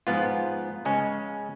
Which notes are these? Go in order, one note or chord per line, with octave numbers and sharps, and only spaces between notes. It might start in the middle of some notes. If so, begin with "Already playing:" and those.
G#2 F3 B3 F4
C#3 G#3 C#4